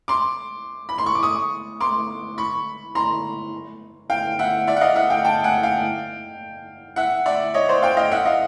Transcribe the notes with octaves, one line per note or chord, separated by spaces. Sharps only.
C6 D6
B5
C6
C#6
D6
C#6 D#6
C6 D6
B5 C#6
A#5 C6
F5 G5
E5 F#5
D5 E5
F#5
D#5 F5
E5 F#5
F5 G5
G5 A5
F#5 G#5
F5 G5
E5 F#5
D5 E5
C#5 D#5
C5 D5
F5 G5
D#5 F5
E5 F#5
D#5 F5